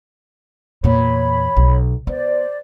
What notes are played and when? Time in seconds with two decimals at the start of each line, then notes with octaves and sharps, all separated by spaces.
0.84 E2 A#2 C#5 B5
1.57 B1
2.07 B3 C5 D5